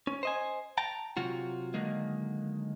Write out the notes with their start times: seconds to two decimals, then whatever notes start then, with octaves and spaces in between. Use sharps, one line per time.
0.07 C#4
0.23 C5 D#5 G#5
0.78 G5 A5 A#5
1.17 C3 F#3 F4 F#4
1.74 D3 D#3 F#3 G#3 A#3